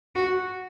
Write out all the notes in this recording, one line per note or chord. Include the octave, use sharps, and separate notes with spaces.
F#4